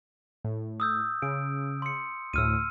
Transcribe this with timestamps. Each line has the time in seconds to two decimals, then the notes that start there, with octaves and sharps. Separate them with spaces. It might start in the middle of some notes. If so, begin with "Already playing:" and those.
0.45 A2
0.80 D#6 E6 G6
1.22 C#3 D7
1.82 C6 C#7
2.34 D2 A2 E6 F6 D#7